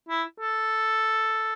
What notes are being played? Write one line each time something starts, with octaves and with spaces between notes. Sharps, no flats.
E4
A4